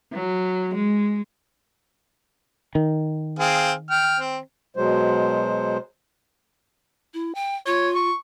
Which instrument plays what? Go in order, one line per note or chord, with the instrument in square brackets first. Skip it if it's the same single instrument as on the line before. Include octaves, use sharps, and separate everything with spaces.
[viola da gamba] F#3
G#3
[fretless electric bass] D#3
[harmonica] C4 G#4 F5
G5 F6
C4
[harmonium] B2 F#3 G#3 C5
[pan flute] E4
G5
[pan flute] F4 [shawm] C#5
[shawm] C#6